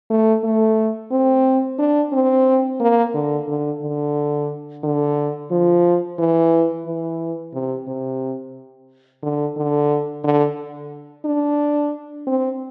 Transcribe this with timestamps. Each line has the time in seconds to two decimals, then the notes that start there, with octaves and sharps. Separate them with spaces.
0.10 A3
0.44 A3
1.11 C4
1.79 D4
2.13 C4
2.80 A#3
3.14 D3
3.48 D3
3.82 D3
4.84 D3
5.51 F3
6.19 E3
6.86 E3
7.53 C3
7.87 C3
9.23 D3
9.57 D3
10.24 D3
11.25 D4
12.27 C4